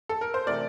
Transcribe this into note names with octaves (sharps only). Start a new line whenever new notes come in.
A4
A#4
C5
C3 E3 A3 A#4 D5